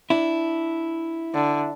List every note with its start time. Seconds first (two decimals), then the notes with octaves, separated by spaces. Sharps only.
0.10 D4 E4
1.34 D3